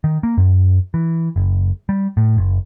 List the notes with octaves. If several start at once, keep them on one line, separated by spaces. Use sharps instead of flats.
D#3
A#3
F#2
E3
F#1
G3
A2
F#1